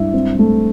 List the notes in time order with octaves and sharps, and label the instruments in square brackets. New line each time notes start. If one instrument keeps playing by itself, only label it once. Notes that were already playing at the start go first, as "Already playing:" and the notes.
Already playing: [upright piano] G2 [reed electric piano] E4 E5
[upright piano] C4
A3